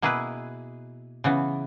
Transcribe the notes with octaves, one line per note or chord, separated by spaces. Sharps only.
B2 A#3 E4 G#4 B4
C#3 E3 B3